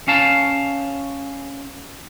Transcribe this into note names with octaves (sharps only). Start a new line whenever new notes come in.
C#4 F5 A5